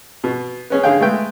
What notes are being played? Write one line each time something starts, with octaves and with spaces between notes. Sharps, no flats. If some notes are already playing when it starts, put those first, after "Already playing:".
B2
B3 C#4 G#4
D3 G#4 F5 G5
G#3 A3 B3 G5